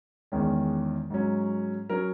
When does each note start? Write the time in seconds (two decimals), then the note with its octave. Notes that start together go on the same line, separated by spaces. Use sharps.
0.32 E2 D#3 G#3 C#4
1.10 G#2 F#3 C#4
1.89 F#3 C#4 A#4